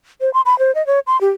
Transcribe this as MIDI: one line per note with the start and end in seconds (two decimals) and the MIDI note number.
0.21 0.32 72
0.34 0.41 84
0.46 0.58 83
0.59 0.74 72
0.75 0.85 75
0.87 0.99 73
1.07 1.19 84
1.21 1.30 67